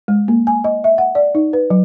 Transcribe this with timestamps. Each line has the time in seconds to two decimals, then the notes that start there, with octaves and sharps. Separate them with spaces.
0.08 G#3
0.28 A#3
0.47 G#5
0.64 D#5
0.84 E5
0.98 F#5
1.15 D5
1.35 D#4
1.53 B4
1.70 F#3